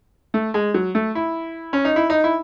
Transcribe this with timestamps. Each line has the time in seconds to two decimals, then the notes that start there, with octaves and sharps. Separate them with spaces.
0.34 A3
0.54 G#3
0.74 F#3
0.95 A3
1.15 E4
1.73 C#4
1.85 D#4
1.96 E4
2.10 D#4
2.24 E4